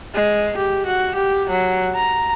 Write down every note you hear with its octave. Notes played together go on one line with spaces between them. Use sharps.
G#3
G4
F#4
G4
F#3
A#5